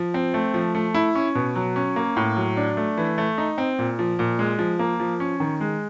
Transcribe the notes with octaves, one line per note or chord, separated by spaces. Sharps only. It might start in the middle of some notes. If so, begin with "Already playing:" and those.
Already playing: F3
C4
A3
F3
A3
E4
C#4
B2
F#3
C#4
A#3
A2
F#3
D4
A3
E3
A3
D#4
C4
A#2
F3
A#2
G#3
F3
A#3
F3
C#4
D#3
G#3